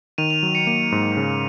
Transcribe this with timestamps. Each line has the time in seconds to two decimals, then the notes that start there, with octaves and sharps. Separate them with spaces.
0.18 D#3 D#7 F7
0.30 D#7 F7
0.43 F#3
0.55 C#7 D#7
0.67 A#3 C#7 D#7
0.92 G#2
1.17 C#3